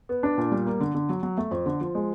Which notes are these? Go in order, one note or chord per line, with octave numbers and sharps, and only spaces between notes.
B3
D4
A#2
G3
A#3
D3
D3
F#3
F#3
A3
F2
D3
F3
G#3